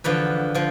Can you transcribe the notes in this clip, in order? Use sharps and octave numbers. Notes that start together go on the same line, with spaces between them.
E2 D3 F3 B4
D3 F3